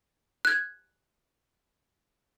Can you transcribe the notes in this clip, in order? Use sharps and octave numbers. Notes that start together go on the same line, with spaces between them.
F#6 G#6